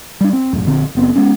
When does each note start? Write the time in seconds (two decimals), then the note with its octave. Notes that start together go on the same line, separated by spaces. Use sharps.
0.21 G3 D4
0.33 C4
0.53 E1 F#2 A2
0.65 A#1 D3 C4
0.95 F#1 B3 C4
1.16 G#3 B3 C#4